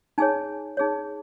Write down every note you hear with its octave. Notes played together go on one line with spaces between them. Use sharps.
D#4 G#4 C#5 G#5
D#4 G#4 C#5